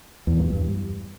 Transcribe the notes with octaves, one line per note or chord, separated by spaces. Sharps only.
E2
G2
G2